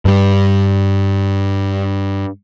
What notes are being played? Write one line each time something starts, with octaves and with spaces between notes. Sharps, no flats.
G2 G3